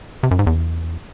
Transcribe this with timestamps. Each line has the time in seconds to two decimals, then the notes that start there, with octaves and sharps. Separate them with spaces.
0.23 C3
0.31 F#2
0.39 G#2
0.47 E2